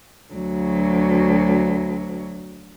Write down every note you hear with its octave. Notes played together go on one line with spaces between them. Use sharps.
D2 F#3